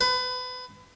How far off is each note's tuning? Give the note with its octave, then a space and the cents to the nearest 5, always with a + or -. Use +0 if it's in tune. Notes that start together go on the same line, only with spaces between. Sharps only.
B4 +30